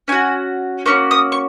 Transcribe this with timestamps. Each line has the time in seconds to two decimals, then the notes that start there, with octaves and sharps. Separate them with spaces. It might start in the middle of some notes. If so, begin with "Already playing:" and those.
0.08 C#4 F#4 G#5
0.86 A#3 C#4 F#4 C#6
1.11 D#6
1.32 C#6